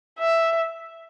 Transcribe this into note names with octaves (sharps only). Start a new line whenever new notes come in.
E5